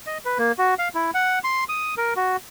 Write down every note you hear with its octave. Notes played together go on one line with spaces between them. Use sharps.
D#5
B4
A#3
F#4
F5
E4
F#5
C6
D#6
A#4
F#4